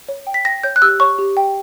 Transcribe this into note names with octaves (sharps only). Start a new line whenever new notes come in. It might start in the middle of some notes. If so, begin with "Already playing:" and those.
C#5
G5
B6
G5 A#6
C#5 G6
F#6
G4 E6
C#5 C#6
G4
G5